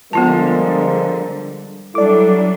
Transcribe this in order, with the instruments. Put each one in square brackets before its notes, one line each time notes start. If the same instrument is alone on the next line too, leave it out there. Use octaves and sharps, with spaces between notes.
[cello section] D3 G3 [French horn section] F3 G#3 A#4 [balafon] B3 F4 A5
[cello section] F#3 G3 D4 [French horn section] E4 A4 [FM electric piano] D5 D6